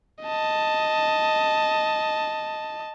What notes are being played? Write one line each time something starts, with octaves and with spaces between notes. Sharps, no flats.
D#5 A5